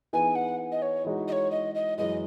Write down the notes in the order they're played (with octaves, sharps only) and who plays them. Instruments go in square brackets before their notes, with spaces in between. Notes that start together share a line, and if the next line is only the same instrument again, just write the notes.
[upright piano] E3 B3 D#4 G#4 B4 [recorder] G#5
[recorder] F#5
D#5
C#5
[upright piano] E3 G#3 D#4 F#4
[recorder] D#5
C#5
D#5
D#5
[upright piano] F#2 E3 G#3 [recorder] D#5